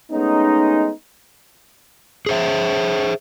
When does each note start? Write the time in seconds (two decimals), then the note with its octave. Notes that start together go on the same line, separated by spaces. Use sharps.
0.11 G#3 A3 B3 C#4 D#4
2.26 G#4 C5 E5